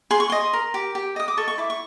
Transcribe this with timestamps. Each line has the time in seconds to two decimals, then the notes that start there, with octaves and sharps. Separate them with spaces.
0.11 G#4 C6
0.20 C#6
0.30 D#5 C6
0.53 A#4
0.74 G4
0.95 G4
1.16 D#5 D#6
1.28 D6
1.37 A4 C#6
1.48 C#6
1.58 E4 D6
1.70 C#6